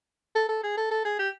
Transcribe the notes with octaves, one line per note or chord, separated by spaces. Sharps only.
A4
A4
G#4
A4
A4
G#4
G4